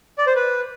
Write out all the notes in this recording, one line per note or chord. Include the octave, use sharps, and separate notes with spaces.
D5
C5
B4